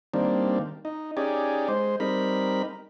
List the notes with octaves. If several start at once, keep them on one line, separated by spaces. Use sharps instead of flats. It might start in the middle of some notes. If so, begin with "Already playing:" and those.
D#3 G3 A#3 C4 D4
D#4
C#4 D#4 G4 G#4 D5
G#3 C5
G3 C4 D#4 A#4 B5